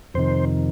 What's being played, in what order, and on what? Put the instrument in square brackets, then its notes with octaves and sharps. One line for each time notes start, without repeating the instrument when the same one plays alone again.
[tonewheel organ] F2 C3 D#3 C5